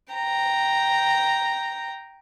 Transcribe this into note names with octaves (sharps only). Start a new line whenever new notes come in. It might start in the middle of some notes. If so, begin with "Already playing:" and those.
G5 A#5